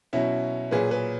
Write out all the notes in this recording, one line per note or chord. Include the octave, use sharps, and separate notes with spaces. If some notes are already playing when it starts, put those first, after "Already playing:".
B2 F#3 C#4 E4
A#2 F#3 G#4 B4
G#4 B4